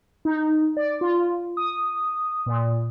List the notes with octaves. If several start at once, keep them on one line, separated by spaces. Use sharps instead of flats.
D#4
D5
F4
D#6
A#2